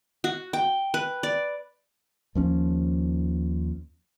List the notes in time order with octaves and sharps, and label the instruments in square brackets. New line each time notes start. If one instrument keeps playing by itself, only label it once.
[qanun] F#4
G5
B4
D5
[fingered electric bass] D#2 F3 C#4